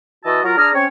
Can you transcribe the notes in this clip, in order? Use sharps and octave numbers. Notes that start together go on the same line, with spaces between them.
E3 F#4 D#5 A5 E6
F#3 F4 A#4
D4 G#4 A#5 F6
C4 C#4 C#5